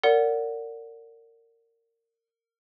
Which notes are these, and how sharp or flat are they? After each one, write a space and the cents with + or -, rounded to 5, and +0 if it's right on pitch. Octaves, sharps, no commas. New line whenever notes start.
A#4 -25 D5 -25 F#5 +0